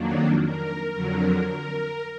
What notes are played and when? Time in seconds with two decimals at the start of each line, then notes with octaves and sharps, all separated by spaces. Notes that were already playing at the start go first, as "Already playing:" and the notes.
Already playing: F2 D#3 F#3 A#3 D4
0.42 A#4
0.95 F2 D3 F#3
1.47 A#4